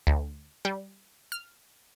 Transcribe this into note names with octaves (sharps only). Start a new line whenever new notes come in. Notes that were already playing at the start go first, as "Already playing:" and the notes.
D2
G3
F6